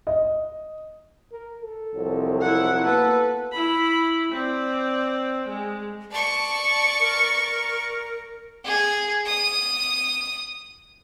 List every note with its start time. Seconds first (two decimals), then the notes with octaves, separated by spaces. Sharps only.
0.07 D#5
1.32 A#4
1.63 A4
1.95 C2 F2 F#3
2.41 E4 F#5
2.84 A#3 B3 F#4 A4 B4
3.52 E4 B5
4.33 C4 D5
5.49 G#3
6.12 D5 A5 C#6
7.00 A#4
8.65 G#4
9.26 D#6